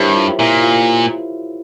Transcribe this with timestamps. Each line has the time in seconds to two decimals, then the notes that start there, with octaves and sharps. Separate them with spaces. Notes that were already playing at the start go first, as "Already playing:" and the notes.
Already playing: G2 E4 G4 A#4 C5 C#5 E5
0.16 F4
0.40 A#2 E4
0.63 F4